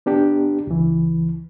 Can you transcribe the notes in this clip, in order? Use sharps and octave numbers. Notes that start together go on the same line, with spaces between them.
B3 D4 G4
C#2 E3